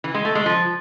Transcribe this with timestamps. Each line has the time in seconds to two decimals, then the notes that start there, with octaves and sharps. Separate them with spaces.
0.04 E3
0.14 G#3
0.25 A3
0.35 G#3
0.46 F3